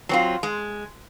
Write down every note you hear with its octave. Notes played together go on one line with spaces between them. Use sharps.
F#3 C4 F4
G#3